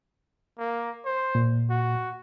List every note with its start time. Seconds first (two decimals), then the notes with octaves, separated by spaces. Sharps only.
0.59 A#3
1.05 C5
1.35 A#2
1.70 F#4